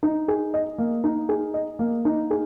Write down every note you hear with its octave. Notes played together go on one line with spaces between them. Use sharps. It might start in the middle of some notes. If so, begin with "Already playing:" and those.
D#4
G#4
D#5
A#3
D#4
G#4
D#5
A#3
D#4
G#4